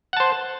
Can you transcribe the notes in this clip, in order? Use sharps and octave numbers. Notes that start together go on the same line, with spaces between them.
C5 F#5 A5